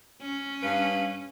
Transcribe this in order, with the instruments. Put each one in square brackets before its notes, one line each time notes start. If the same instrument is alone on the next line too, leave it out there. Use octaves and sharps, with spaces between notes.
[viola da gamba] C#4
[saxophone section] G2 B4 F5